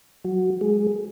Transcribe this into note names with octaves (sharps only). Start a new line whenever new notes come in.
F#3 F#4
G#3 G#4